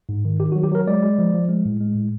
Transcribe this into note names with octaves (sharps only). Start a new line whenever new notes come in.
G#2
D#3
D#3 G4
F#4
F#3
G4
F#3 A#4
G#3 D5
G#3
F3
F3
G#3
A2
G#3
A2